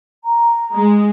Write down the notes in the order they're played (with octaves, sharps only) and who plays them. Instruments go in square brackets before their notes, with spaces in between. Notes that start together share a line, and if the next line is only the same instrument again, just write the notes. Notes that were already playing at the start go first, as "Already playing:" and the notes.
[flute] A#5
[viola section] G#3